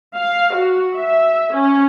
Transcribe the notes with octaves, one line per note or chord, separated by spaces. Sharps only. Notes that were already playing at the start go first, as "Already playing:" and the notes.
F5
F#4
E5
C#4